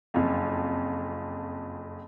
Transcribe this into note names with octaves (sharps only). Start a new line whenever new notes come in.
F#1 F2